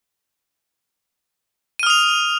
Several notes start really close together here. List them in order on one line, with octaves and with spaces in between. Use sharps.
D#7 F6 D#6 F7